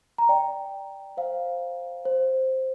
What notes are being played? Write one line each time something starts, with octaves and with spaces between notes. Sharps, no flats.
A#5
D5 G5
C5 F5
C5